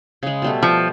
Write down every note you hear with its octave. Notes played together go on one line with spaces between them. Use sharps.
C#3 G#3
B2 G3 A3
F3